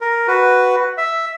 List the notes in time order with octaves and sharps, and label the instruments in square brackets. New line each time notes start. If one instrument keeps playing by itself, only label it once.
[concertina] A#4
F#4 B4
E5